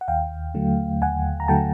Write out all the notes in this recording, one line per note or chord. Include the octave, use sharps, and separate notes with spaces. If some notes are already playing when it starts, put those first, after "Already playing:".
F#5
D#2 F5 G5
D3 F#3 A3
D#2 F#5 G#5
A#5
D3 F#3 A3 G5 A5